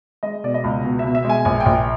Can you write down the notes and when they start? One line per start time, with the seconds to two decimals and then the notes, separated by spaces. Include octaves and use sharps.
0.23 G#3 D#5
0.44 B2 D5
0.54 D#5
0.64 C#2
0.84 B2
0.99 E5
1.05 B2
1.15 E5
1.25 G#3 G#5
1.45 A#1 G#5
1.60 G5
1.66 A#1